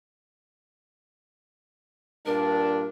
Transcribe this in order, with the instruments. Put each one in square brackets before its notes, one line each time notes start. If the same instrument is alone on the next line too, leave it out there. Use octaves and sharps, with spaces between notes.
[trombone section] G2 A#2 D4 [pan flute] A#4